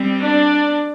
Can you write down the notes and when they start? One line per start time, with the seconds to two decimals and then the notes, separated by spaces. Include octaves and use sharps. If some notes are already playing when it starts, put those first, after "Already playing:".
Already playing: G3 C4
0.22 D4 D5